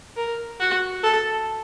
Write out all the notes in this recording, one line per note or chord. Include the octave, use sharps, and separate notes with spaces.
A#4
F#4
A4